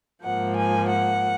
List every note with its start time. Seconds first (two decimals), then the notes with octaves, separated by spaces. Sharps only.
0.24 G#2 F3 A#3 F#5
0.57 G#5
0.89 F#5